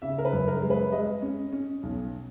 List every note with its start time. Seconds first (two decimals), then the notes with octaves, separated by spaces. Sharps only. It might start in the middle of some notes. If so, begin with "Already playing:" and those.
0.02 C#3 E5
0.18 A#4
0.25 B4
0.33 F#2
0.48 A#4
0.62 G#3
0.70 B4
0.92 G#3 D#5
1.22 C#4
1.53 C#4
1.83 B1